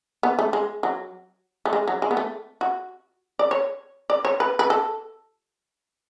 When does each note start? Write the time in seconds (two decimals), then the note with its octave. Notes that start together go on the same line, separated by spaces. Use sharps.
0.23 B3
0.39 A3
0.53 G#3
0.83 F#3
1.65 A3
1.73 G#3
1.88 F#3
2.02 G#3
2.11 B3
2.17 A3
2.61 F#4
3.39 D5
3.51 C#5
4.10 D5
4.25 C#5
4.40 B4
4.59 B4
4.70 A4